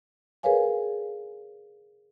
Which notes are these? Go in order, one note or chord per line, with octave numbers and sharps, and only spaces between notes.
G#4 A#4 B4 C#5 F5 G#5